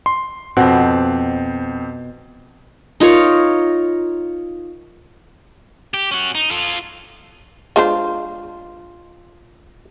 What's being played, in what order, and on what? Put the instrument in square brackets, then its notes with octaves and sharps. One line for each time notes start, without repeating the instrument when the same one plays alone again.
[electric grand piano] C6
[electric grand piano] F2 C4 [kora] B2
[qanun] D#4 F4 A#4 C#5
[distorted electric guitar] G4
C#4 F#4
D#4
F4 A4
[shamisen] G#3 D4 C5 [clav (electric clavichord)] F4